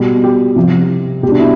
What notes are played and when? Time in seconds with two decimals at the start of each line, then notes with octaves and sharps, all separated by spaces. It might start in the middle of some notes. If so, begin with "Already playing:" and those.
Already playing: B2 G3
0.24 G4
0.56 C3 F3
1.23 B2 G4
1.27 G3 D4
1.39 E4